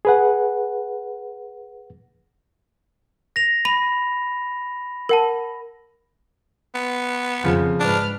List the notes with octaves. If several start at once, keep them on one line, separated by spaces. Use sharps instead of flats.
G#4 B4 F#5
A#6 F7
B5 A#6 D#7 F7
A#4 F#5 A5
B3
F2 C#3 F3
G#2 D4 B4 F6